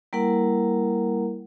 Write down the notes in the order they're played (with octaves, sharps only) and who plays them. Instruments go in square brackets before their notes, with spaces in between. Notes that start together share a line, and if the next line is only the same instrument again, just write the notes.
[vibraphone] G3 A#3 E4 A#4 F#5